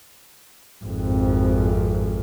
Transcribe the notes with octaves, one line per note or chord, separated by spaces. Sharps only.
G#1 F2